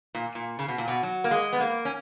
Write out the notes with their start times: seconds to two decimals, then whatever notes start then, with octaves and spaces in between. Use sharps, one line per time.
0.15 A#2
0.35 A#2
0.59 C#3
0.68 B2
0.78 A#2
0.88 B2
1.03 F#3
1.24 A#3
1.31 G#3
1.53 B3
1.60 A#3
1.85 C#4